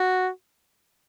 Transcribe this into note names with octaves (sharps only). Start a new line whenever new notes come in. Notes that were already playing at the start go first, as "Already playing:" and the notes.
Already playing: F#4